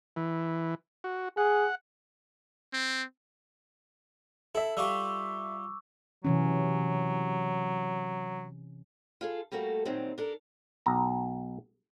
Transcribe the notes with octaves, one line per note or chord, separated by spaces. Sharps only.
E3
F#4
G#4 F#5
C4
E4 A4 E5
G3 F4 G4 C#6 D6 E6
C3 E3 F#3 C#4
F4 G#4 A4
G3 A3 A#3 F#4 A4
A#2 D#3 F#3 G3 C4
D4 A4 A#4
B1 A#5